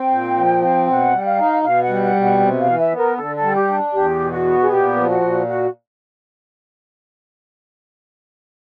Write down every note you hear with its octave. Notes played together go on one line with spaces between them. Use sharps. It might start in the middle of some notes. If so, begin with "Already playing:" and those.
Already playing: C4 G5
A#2
F3
C4
B2 F#5
G3
F5
D#4
B2 F5
F#5
G3
F#5
B2
F#5
C3
F5
E3
E5
B3
A#4
D3 A4
A4
G3
G4
D4
E2 G4
B2
F#4
B3
G#4
A#2 G4
F3
F#4
A#2
F#4